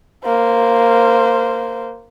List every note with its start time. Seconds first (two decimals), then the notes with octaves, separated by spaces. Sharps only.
0.24 A#3 C5